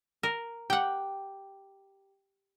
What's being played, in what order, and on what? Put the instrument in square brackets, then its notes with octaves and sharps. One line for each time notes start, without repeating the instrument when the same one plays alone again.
[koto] A#4
[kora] G4 [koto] F#5 G5